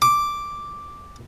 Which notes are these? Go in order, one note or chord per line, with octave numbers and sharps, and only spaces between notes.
D6